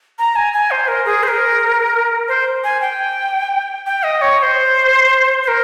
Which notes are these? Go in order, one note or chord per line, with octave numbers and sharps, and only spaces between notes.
A#5
G#5
G#5
C5
A#4
G#4
C5
A#4
C5
G#5
G5
G5
D#5
C#5
C#5
C5
C5
A#4